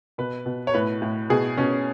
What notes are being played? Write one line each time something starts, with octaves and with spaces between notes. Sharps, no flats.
B2 B4
B2
C#5
A2 B4
A2
B2 G#4
B2 C#4